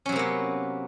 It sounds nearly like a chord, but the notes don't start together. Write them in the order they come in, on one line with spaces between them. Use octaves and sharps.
C#4 F#3 C3 A#3 B3